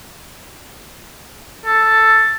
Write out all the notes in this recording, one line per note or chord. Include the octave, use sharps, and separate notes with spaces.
A4